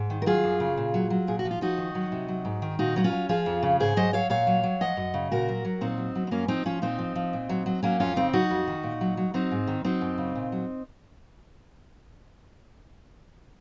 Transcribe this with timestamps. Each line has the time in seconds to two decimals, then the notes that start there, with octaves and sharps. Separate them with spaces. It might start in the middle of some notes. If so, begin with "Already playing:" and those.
Already playing: G#2
0.10 D#3
0.22 A#4
0.26 F#3 F4 G#4
0.44 F#2
0.60 C#3
0.77 A#2
0.94 F#3
1.10 F#3
1.27 A#2 G#4
1.39 F#4
1.45 F3
1.51 F4
1.61 F3 D#4 F#4
1.78 D#3
1.95 F#3
2.12 C3
2.28 F#3
2.45 G#2
2.62 D#3
2.79 A#2 D#4 F#4
2.96 F#3 D#4
3.04 C#4 F4
3.12 F#3
3.29 F3 F4 G#4
3.46 F2
3.63 C#3
3.80 G#2 G#4 C5
3.96 F#3 C5 D#5
4.13 F#3 C#5 F5
4.30 A#2 C#5 F5
4.47 F#3
4.63 F#3
4.81 F3 D#5 F#5
4.97 F#2
5.14 C#3
5.31 A#2 F#4 A#4
5.48 F#3
5.65 F#3
5.81 A#2 C4 D#4
5.98 F#3
6.15 F#3
6.27 C4
6.31 F#2 A#3 C#4
6.48 F3 C4 D#4
6.65 F3 C#4 F4
6.82 A#2 C4 D#4
6.99 F3
7.16 F3
7.33 A#2
7.49 F#3
7.66 F#3
7.83 F#3 A#3 C#4
8.00 F2 C#4 F4
8.16 C#3 C4 D#4
8.33 F#3 D#4 F#4
8.50 F2
8.68 D#3
8.83 A#2
9.01 F#3
9.17 F#3
9.34 F#3 C4 D#4
9.51 G#2
9.67 D#3
9.84 F#3 C4 D#4
10.01 F#2
10.18 C#3
10.35 A#2
10.52 F#3